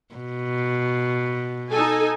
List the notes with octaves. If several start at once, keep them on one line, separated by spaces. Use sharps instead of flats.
B2
D#4 A4 G#5